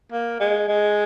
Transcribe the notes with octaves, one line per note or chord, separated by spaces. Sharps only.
A#3
G#3
G#3